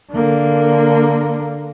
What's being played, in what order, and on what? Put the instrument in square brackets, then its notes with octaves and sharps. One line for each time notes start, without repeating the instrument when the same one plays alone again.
[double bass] D3 A#3